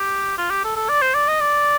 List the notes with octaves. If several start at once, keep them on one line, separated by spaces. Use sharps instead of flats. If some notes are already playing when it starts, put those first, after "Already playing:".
Already playing: G4
F4
G4
A4
A4
D5
C5
D5
D#5
D5